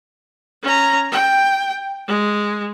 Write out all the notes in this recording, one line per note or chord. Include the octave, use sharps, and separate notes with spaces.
C#4 A#5
G5
G#3